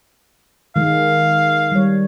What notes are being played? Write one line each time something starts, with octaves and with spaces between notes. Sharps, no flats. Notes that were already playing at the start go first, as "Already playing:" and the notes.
D#3 G#3 F5
G3 C#5